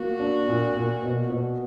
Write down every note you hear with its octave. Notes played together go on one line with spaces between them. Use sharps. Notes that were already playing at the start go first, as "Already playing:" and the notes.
Already playing: A#3 F#4
D4
A#2
A#2
B2
B2